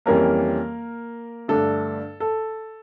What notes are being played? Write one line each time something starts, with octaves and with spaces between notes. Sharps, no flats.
F2 E3 G3 A#3 C#4 A#4
G2 D3 A3 D4 A4
A4